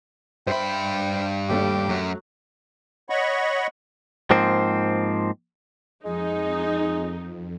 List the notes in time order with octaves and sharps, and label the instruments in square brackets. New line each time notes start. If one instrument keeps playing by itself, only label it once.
[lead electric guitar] G2 B5 [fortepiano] C5 E5 [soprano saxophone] G5
[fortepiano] D#2 A3 D4 [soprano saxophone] G4
[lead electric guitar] F#2 [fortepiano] F#3 A3
[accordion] C#5 D#5 F#5 B5 C#6
[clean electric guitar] G#2 F3 A#3 C4
[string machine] F2 [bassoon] G#3 [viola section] D#4